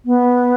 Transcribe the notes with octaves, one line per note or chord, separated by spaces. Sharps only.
B3